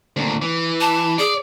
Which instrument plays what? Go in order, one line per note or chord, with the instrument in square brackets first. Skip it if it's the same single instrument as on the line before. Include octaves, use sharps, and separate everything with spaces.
[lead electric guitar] D2 A#2
E3
[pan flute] A5
[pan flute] G#4 [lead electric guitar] D5